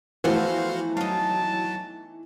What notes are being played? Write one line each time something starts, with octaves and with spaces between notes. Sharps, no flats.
E3 F3 A3 B3 F#4 C5 E5 F5
F#3 D#4 F5 A5